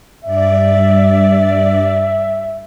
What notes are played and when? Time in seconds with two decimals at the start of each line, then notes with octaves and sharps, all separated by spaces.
0.25 G2 D5 E5